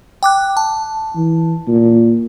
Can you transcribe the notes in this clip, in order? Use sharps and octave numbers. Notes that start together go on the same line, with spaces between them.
G5 D6 F#6
A5
E3
A#2